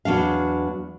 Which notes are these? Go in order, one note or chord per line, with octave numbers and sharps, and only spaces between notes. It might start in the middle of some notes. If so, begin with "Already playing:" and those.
E2 F#3 D4 F5